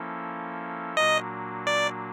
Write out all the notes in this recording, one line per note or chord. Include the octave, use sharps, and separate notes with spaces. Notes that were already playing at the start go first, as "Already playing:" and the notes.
Already playing: F3 A#3 C#4 E4 A4
A#2 F#3 A#3 D4 F#4 D#5
D5